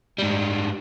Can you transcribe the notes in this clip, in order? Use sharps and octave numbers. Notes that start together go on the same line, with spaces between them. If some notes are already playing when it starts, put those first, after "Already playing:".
G#2 G3